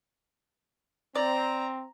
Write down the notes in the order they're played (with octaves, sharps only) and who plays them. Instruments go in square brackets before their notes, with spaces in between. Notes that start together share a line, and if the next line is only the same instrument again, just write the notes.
[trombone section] C4 [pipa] D5 [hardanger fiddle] A#5